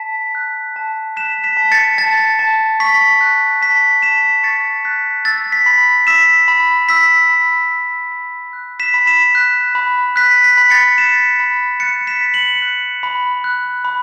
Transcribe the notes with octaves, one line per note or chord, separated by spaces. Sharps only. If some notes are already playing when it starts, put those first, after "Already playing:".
Already playing: A5 B6
F#6
A5
F#6 B6 E7
B6 E7
A5
A6 C#7
A5 A6
A5
C#6 B6
F#6
A5 B6
A5 B6 E7
C#6 A6 C#7
F#6 B6
E6 A6
B6
B5
E6 B6 E7
B5
E6 B6
B5
E6
B5
F#6
B6 E7
B5
B6 E7
F#6
B5
F#6 B6
B6
B5
A6 C#7
F#6 B6 E7
B5
F#6 A6 C#7
B6 E7
B5
C#7 F#7
F#6
B5
F#6
B5